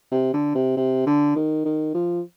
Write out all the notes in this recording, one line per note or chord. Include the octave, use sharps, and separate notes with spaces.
C3
D3
C3
C3
D3
D#3
D#3
F3